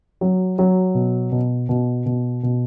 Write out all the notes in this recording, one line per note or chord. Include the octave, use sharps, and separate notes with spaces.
F#3
F#3
B2
B2
B2
B2
B2